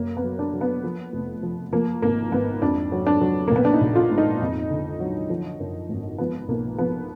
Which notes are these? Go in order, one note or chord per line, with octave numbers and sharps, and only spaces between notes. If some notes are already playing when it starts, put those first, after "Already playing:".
Already playing: F#2 A#3
B3
F#3
D4
F#3
B3
F3
F1
F3
F3 A#3
G#1 A#3
G#1 B3
F2 D4
F#3
D4
F#3
A#3
A#1 B3
D4
D#4
A#1
F4
G#2
D#4
F2
D3
F#3
F3
F#2
G#1
F3 B3
B1 A#3
F3 B3